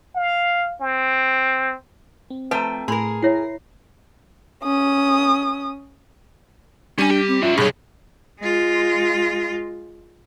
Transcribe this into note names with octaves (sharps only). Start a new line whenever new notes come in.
F5
C4
C4
F3 A3 B4 G5 A#5
A2 G#4 A#4 B5 C6
E4 C#5 E5 A#6 C7
C#4 D#6
G3 C#4 D4 G#5 D#7
G4
C4
C#4 F4 E5
B1 G2 G#4 C#5
G#3 F4